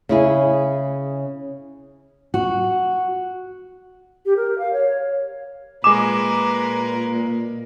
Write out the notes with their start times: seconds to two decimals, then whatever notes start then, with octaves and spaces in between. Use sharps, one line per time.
0.09 C#3 E4 G#4
2.34 F#4
4.26 G4
4.37 A#4
4.58 F5
4.73 C#5
5.84 A#2 G#3 A#4 B4 G#5 D6 E7